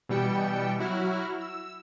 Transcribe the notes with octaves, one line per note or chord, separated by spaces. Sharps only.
B2 E3 G3 G5 C#7 E7
F#3 E4 F#4 F6
E6